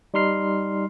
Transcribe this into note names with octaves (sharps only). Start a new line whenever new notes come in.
G3 D#4 C6 F6 C7